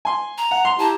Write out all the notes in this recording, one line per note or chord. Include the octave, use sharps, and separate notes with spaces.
G#5 C6
A#5
F#5
C6
E4 G4 A5 A#5